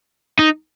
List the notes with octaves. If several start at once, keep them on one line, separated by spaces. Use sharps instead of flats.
D#4